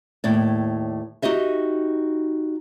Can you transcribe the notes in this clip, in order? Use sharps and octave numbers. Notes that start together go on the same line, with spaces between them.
D#2 A2 D5
D#4 F#4 G4 D#5 E5